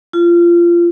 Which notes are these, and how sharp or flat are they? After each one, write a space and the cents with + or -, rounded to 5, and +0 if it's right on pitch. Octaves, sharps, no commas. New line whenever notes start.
F4 -25